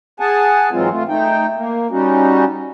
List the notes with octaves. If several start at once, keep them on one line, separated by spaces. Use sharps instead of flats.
G#4 F#5 G#5 A5
G#2 E3 F#3 G#3 C4 F4
A3 F4
A3 D#4 G5
A#3
G3 C#4 D#4 F#4